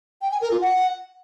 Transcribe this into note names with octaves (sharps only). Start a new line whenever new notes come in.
G5
G#5
A#4
F4
F#5